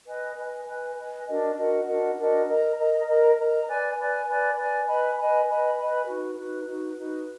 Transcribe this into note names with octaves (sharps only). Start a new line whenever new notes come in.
B4 D#5 G#5
B4 D#5 G#5
B4 D#5 G#5
B4 D#5 G#5
D4 F#4 A#4 D#5
D4 F#4 A#4 D#5
D4 F#4 A#4 D#5
D4 F#4 A#4 D#5
A#4 D#5 A#5
A#4 D#5 A#5
A#4 D#5 A#5
A#4 D#5 A#5
B4 D5 G#5
B4 D5 G#5
B4 D5 G#5
B4 D5 G#5
B4 D#5 G#5 B5
B4 D#5 G#5 B5
B4 D#5 G#5 B5
B4 D#5 G#5 B5
D#4 F#4 B4
D#4 F#4 B4
D#4 F#4 B4
D#4 F#4 B4